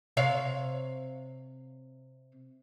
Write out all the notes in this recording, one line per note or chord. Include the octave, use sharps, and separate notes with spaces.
C3 C#5 F5